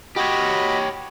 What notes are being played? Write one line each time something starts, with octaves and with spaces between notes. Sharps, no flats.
F#4 G4 C#5 D#5 B5